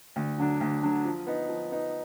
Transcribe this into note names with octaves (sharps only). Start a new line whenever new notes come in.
D2
D3 F#3 D4
D2
D3 F#3 D4
F3
B3 D#4
F3
B3 D#4